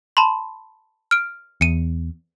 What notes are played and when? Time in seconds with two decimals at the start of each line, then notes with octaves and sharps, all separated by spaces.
0.17 A5 B5 C6
1.11 F6 D7
1.61 E2 C#7 D#7